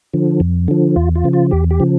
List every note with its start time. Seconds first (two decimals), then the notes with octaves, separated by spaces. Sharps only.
0.13 D3 F3
0.40 F2
0.68 D3 F3
0.96 E2 F4
1.15 F4
1.24 C#3 F3
1.33 F4
1.51 E2 G4
1.71 G4
1.80 C#3 F3